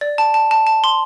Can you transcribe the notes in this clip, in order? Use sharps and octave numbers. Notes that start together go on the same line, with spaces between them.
D5
A5
A5
A5
A5
C6